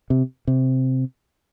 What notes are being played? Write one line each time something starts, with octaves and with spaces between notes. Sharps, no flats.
C3
C3